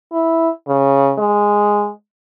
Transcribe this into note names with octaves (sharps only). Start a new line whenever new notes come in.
E4
C#3
G#3